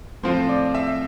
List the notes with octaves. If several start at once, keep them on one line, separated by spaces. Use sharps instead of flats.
A2 F3 C4 F4 C5 C6
D5 D6
E5 E6